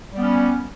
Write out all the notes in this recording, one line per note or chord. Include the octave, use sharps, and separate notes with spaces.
G3 B3 C#4